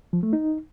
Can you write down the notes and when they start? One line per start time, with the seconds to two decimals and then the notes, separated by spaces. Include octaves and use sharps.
0.13 F3
0.23 A3
0.33 D#4